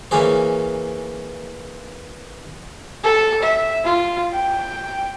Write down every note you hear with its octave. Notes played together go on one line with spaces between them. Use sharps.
E3 A#3 C#4 G#4 C5
A4
E5
F4
G5